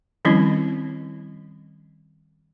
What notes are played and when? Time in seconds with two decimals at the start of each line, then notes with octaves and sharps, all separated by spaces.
0.25 D#3 F3 G3 C4 C#4 E4